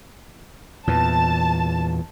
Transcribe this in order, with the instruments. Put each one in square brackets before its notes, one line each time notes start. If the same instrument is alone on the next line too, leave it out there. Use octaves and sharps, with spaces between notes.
[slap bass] E2 A#2 E3 [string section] A5